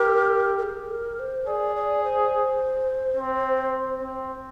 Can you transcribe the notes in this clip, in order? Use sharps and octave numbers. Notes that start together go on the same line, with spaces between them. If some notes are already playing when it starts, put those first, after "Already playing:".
Already playing: G4 A#4
A#4
G#4
A#4
C5
G#4 D5
D5
C5
C4
C4